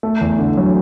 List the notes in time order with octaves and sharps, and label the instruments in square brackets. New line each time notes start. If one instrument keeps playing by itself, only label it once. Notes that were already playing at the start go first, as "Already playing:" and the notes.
[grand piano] A3
E2
D3
F#3